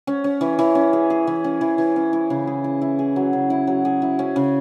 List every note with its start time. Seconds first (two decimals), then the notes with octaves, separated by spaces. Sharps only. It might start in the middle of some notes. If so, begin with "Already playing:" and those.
0.07 C#4
0.24 C#4
0.41 E3
0.59 E3
0.75 C#4
0.93 G#4
1.10 G#4
1.27 E3
1.44 C#4
1.61 E3
1.78 E3
1.96 C#4
2.13 E4
2.30 C#3
2.47 G#4
2.64 E4
2.82 E4
2.99 G#4
3.16 F#3
3.33 C#3
3.50 E4
3.67 F#3
3.85 G#4
4.02 E4
4.19 C#4
4.36 C#3